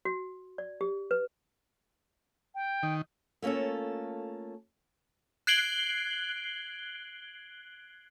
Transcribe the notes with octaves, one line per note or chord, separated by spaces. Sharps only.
F#4
D5
G4
B4
G5
D#3
A3 A#3 C#4 F4 A4
F#6 G#6 C7 D7 F#7 G7